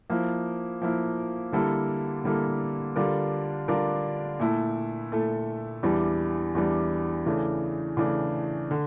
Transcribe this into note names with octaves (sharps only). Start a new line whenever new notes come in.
F3 A#3 E4
F3 A#3 E4
D3 G3 A#3 E4 A4
D3 G3 A#3 E4 A4
D3 G3 D4 F4 A#4
D3 G3 D4 F4 A#4
A#2 A3 E4 A4
A#2 A3 E4 A4
E2 E3 G3 D4
E2 E3 G3 D4
C#3 E3 A3 D4
C#3 E3 A3 D4
D3